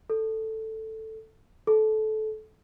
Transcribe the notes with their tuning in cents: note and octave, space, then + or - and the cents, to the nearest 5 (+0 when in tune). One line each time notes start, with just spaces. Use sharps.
A4 +5
A4 -20